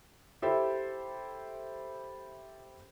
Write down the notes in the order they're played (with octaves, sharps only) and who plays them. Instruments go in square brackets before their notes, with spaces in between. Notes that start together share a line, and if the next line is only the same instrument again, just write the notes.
[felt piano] E4 G4 A4 C5 E5